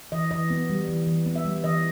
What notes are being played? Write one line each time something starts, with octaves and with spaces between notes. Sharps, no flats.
E3 D#5
E3 D#5
B3
G3
E3
E3
B3
E5
G3
E3 D#5